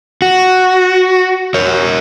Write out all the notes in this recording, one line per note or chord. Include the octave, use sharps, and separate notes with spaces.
F#4
A#4 C#5